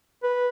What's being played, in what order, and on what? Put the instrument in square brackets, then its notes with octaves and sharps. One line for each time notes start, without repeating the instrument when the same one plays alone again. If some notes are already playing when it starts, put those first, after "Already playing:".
[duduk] B4